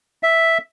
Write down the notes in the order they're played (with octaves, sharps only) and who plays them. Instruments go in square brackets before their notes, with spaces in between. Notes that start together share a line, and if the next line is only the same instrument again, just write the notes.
[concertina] E5